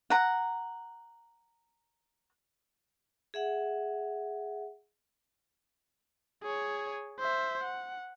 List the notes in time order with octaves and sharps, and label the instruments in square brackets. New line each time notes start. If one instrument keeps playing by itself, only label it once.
[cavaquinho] F#5 A#5
[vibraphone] G#4 E5 F#5
[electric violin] G#4 C#5
C5 E5
F#5